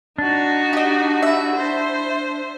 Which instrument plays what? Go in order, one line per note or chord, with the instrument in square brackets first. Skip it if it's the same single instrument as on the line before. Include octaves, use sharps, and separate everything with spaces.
[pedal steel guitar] D4 [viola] D#4 F#4
[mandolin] G4 D#5
E4 E5
[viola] C5